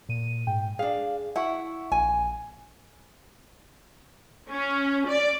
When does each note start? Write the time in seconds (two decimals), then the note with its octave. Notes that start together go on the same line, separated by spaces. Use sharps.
0.09 A#2 D#7
0.47 G#2 G5
0.79 D4 G#4 F5
1.36 E4 E5 F#5 C#6
1.92 A#1 G#5
4.49 C#4
5.08 D5